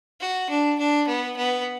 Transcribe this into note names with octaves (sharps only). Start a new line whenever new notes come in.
F#4
D4
D4
B3
B3